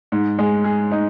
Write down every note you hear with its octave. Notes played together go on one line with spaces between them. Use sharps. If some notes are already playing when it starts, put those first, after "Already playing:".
G#2
G#3
G#4
D#4